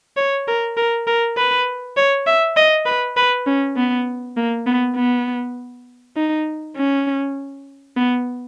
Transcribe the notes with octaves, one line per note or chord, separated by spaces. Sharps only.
C#5
A#4
A#4
A#4
B4
C#5
E5
D#5
B4
B4
C#4
B3
A#3
B3
B3
D#4
C#4
B3